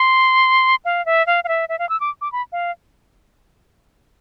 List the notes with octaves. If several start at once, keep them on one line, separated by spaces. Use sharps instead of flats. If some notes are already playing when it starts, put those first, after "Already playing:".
Already playing: C6
F5
E5
F5
F5
E5
E5
F5
E6
D6
D6
B5
F5